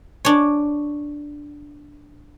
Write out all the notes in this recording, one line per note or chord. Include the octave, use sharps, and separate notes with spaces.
D4 C#5